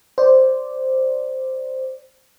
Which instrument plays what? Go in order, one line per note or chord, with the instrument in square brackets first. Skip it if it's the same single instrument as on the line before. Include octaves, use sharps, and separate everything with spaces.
[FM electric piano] C5 D5